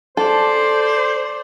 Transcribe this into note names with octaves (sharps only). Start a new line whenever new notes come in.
A4 C5 D5